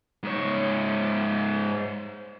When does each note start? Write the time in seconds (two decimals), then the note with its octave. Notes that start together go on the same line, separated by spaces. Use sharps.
0.23 G#2 C#5